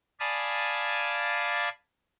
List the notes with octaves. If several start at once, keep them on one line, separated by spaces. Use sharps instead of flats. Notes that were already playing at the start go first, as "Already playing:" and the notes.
D5 F5 G#5 A5 B5 D#6